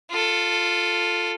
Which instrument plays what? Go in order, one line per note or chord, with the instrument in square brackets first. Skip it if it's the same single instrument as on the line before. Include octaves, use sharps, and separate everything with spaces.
[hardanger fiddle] F4 A4